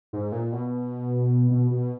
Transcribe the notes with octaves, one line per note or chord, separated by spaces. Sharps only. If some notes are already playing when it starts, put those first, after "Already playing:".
G#2
A#2
B2
B2
B2